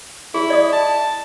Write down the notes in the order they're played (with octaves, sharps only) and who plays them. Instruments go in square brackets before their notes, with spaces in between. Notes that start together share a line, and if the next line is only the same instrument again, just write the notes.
[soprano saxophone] E4 [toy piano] G#4
[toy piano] D5 D#5 D#6
[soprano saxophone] A5